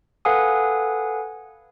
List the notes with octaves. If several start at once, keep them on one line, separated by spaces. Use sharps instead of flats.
A4 B4 F5 F#5 G#5 D#6